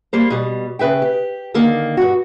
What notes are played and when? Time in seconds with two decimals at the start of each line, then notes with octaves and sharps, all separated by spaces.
0.13 G3 A#3 C5
0.30 B2 G3
0.79 C#3 B4 E5 G5
1.02 G4
1.54 D3 D#3 A#3
1.97 G2 F#4